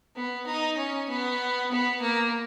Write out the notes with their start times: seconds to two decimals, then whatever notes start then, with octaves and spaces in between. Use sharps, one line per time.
0.16 B3
0.46 D#4
0.77 C#4
1.09 B3
1.71 B3
2.01 A#3